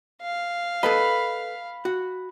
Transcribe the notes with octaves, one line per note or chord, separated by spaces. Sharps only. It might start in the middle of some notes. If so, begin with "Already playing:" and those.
F5
A4 B4 D#5 B5
F#4